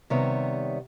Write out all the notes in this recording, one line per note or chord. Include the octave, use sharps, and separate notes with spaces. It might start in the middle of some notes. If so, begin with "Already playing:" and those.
C3 D#3 G3 B3 C#5 E5